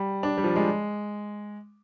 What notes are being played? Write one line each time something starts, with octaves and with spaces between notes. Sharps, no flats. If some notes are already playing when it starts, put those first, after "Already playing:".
Already playing: G3
D4
G3
F3
G#3